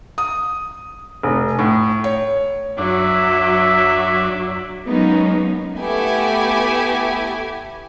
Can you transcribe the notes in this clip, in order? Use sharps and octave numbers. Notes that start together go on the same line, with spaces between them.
D#6
F1
A2
C#5
F#2 F#3 D4 E5
F#3 G#3 A#3 B3 C#4 D#4
A3 B3 E4 G4 G#5